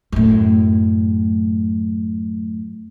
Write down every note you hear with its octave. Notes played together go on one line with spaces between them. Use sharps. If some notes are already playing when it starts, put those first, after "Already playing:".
F#2 A2